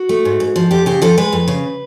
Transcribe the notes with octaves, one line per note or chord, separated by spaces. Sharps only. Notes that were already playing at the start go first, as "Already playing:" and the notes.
Already playing: F#4
A3
G#2
G#2
F3
F2 G4
C#3 G4
F3 A4
G#3 B4
F2
C#3